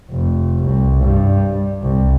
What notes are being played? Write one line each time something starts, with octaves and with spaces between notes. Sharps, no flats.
F1
C2
G2
C2